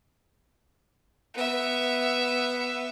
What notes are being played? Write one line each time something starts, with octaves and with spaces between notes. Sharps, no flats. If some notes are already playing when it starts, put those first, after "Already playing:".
B3 E5